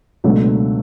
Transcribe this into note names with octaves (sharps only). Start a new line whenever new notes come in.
C#2 B2 F#3 A3 D4